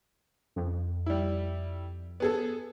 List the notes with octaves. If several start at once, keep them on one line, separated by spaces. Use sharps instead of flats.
F2
G3 E4
B3 G#4 A4